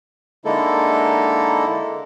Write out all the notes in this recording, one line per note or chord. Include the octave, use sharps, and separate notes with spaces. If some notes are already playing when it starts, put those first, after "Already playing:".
D3 G#3 A#3 D#4 E4 A4